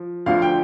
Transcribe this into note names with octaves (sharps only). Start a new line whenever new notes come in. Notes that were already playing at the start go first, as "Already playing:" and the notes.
Already playing: F3
D2 D3 F3 F5
G5